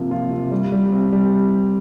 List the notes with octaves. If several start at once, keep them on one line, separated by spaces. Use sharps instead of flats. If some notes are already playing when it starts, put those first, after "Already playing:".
Already playing: C3 F3 A#3
F4
C3
G3
G3
C4
G3